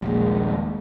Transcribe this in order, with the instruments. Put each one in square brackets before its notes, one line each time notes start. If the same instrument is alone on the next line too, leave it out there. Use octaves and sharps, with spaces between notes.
[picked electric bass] D#1 A#1 [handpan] G#3 A#3